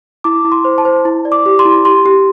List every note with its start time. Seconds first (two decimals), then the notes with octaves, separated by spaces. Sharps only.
0.24 E4 D6
0.45 E4
0.52 C6
0.65 C5
0.78 A5
0.85 C5
1.05 E4
1.25 D5
1.32 D6
1.46 G4
1.59 C6
1.65 E4
1.85 G4 C6
2.06 G4